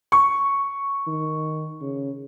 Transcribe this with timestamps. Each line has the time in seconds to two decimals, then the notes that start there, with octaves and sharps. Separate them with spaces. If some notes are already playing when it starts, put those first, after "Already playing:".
0.12 C#6
1.07 D#3
1.81 C#3